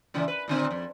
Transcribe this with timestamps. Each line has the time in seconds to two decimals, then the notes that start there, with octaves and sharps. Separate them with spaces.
0.14 A#2 C#3 E3
0.28 B4
0.48 A#2 D3 C4
0.71 F2